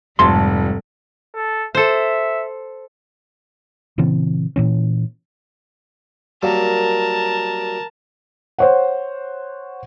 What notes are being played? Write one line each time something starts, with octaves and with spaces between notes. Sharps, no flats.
F1 G#2 C3 F#3 G3 A3 C6
A4
A4 C5 E5
A#2 C#3 E3 C4
A#2 E3 C#4
F#3 G3 A#3 A#4 A5
C5 C#5 F#5